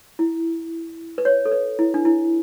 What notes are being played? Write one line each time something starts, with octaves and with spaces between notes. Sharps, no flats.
E4
B4
C#5
A4
B4
E4
D4
E4